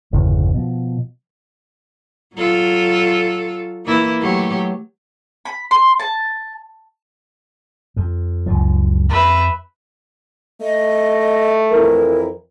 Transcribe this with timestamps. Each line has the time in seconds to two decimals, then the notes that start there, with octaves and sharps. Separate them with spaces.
0.13 G1 E2 C#3 E3
0.54 B2 F3
2.35 F#3 F4 A4
3.85 E3 A#3 E4
4.21 F#3 A3 G4
5.45 B5
5.71 C6
5.99 A5
7.96 F2
8.46 C#2 F#2 F3
9.09 F2 B4 E5
10.61 A3 D#5
11.72 F2 E3 E4 A#4